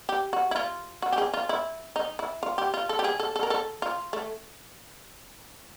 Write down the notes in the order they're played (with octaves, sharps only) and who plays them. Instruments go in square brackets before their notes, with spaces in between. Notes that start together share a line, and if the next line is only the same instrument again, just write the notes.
[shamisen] G4
F#4
E4
F4
F#4
G4
G#4
F4
E4
D#4
E4
F4
G4
F4
A4
G4
G#4
A4
A4
A#4
A4
F4
A3